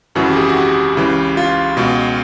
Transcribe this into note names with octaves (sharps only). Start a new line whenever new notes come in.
G#1 F#2 C#3 E3 F#4
G4
G#4
F#4
G4
C#2 C#3 E3
F4
C#2 B2